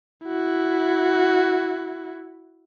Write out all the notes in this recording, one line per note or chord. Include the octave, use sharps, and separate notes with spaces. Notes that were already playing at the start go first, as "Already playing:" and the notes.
E4 F#4